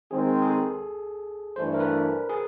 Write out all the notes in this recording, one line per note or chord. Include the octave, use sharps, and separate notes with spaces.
D#3 G#3 C4 G#4
G#4
A4
G2 E3 A3 D4 C5
A#4
B4
G#4